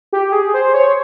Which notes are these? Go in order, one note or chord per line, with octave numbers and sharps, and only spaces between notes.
G4
G#4
C5
C#5